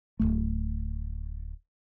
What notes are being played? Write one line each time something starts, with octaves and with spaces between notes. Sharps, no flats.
D1 G#1 A3